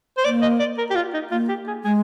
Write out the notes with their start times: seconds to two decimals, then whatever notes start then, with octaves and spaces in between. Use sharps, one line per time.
0.17 C5
0.25 A#3 D5
0.42 D#5
0.59 D5
0.78 A#4
0.90 G4
0.96 F4
1.14 D#4
1.31 A#3 F4
1.49 G4
1.67 G#4
1.84 G#3 G#4